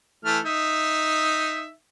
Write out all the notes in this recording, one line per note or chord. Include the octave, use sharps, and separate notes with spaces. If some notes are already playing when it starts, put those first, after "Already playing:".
E3 A3 F6
D#4 E5